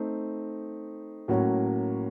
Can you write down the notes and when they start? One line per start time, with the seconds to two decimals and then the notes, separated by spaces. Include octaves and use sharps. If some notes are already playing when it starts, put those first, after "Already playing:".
Already playing: A3 C4 D#4
1.28 A2 F#3 A#3 C#4 F#4